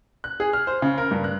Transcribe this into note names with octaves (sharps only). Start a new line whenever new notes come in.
F#6
G#4
F6
C5
C#3
A#4
G2
F#6